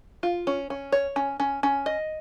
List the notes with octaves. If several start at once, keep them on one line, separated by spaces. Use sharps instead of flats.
F4
C#4
C#4
C#5
C#4
C#4
C#4
D#5